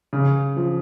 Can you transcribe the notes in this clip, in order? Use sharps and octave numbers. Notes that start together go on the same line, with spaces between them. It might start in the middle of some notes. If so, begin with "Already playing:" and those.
C#3
F3